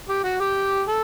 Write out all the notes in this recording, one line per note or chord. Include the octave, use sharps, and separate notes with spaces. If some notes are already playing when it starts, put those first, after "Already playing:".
G4
F#4
G4
A4